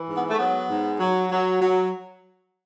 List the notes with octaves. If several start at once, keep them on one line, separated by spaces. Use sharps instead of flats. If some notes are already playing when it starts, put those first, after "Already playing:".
Already playing: E3
G#2
B3
A3
F#3 B3
G#2
F#3
F#3
F#3